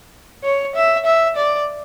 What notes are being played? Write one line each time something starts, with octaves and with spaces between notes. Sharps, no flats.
C#5
E5
E5
D5